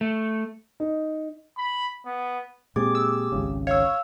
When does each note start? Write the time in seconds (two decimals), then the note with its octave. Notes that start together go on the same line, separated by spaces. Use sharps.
0.01 A3
0.80 D#4
1.57 B5
2.06 B3
2.76 A#2 G#3 C4 G4 G#4 D6
2.95 E6
3.32 G#1 C#2 C#3
3.67 C#5 F5 E6